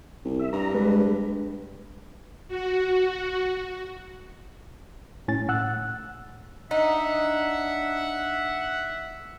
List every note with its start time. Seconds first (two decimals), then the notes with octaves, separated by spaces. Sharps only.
0.25 C2
0.39 E5
0.53 G2 A#5
0.74 G#3 B4
2.48 F#4
5.28 A2 C#4 A6
5.49 A2 F#5 E6 F#6
6.71 D4 D#4 E5 F#5